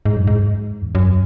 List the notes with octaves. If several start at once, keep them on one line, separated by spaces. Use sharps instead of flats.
G#2
F#2
G#2
E2
F#2